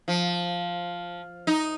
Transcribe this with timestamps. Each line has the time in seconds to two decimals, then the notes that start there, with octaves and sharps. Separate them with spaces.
0.08 F3
1.47 D#4